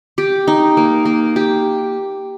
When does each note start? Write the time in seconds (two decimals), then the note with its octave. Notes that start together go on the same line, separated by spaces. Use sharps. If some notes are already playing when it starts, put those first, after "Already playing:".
0.18 G4
0.48 D#4
0.77 A#3
1.05 A#3
1.36 G4